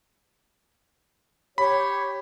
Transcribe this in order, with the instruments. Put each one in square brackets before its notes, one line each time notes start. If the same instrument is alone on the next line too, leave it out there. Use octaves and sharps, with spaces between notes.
[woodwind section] G4 C#5 [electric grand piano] B5